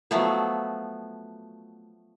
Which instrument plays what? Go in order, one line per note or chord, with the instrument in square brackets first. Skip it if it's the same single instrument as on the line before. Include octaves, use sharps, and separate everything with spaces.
[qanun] F3 F#3 A3 B3